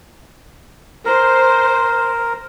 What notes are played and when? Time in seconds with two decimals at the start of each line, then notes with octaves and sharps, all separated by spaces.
1.05 A#4 C5